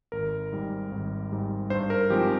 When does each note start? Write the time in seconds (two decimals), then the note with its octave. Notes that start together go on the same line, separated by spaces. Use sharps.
0.12 G#1 A#4
0.52 G#2 G3
0.92 G#1
1.32 G#2 G3
1.70 G2 C5
1.90 A#4
2.10 F3 G#3 C4 D#4 G4